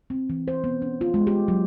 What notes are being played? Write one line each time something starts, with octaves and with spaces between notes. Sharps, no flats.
C4
E3
C5
B3
C#4
F4
G#3
G4
F#3